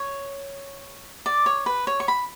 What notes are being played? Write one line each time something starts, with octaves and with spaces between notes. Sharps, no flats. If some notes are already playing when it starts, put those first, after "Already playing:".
Already playing: C#5
D5
C#5
B4
C#5
C#6
B5